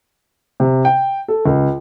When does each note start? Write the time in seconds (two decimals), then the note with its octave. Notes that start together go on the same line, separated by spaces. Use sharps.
0.60 C3
0.85 G5
1.28 A4
1.46 C#2